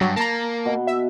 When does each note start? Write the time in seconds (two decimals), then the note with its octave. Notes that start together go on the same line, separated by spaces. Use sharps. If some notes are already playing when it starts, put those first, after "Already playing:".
0.01 G2 F#3
0.16 A#3 A5 A#5
0.65 B2
0.87 E5